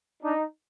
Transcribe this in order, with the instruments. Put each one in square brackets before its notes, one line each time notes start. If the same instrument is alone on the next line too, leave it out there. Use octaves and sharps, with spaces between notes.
[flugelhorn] D4 [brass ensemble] D#4